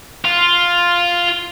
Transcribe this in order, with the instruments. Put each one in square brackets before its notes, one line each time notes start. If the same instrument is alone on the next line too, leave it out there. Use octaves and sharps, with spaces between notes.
[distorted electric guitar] F4